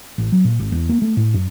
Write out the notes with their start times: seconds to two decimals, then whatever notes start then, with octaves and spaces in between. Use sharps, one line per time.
0.18 A1
0.32 F#3
0.45 A#2
0.60 G#1
0.72 E2
0.89 A#3
1.02 A3
1.17 A2
1.34 F#2